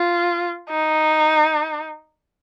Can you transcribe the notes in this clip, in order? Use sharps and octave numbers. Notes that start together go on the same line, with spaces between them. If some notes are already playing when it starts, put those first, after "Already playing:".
Already playing: F4
D#4